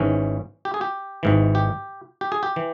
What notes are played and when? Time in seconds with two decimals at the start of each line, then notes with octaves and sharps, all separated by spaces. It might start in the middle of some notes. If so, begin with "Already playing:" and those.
Already playing: G#1 G#2 E3 C#4
0.65 G4
0.74 G#4
0.81 G4
1.23 G#1 G#2 E3
1.55 G4
2.21 G4
2.32 G#4
2.43 G4
2.56 E3